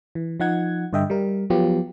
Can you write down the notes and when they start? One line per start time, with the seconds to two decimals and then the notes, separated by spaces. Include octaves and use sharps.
0.15 E3
0.40 F3 D#4 F#5 G#6
0.93 G2 D3 D#5 E5 G5
1.10 G3 A#4
1.50 F3 F#3 B3 F4 G4